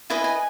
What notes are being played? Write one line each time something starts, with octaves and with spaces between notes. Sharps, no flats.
E4 B4 D#5 G#5
G#5